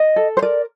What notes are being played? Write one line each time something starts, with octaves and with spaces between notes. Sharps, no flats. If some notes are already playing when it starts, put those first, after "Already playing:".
Already playing: D#5
A4
C5
A#4 D5